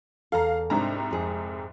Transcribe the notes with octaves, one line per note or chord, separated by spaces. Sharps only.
E2 A4 F5 A#5
C2 G#2 C4 D4 D#4 A#5
F2 G#4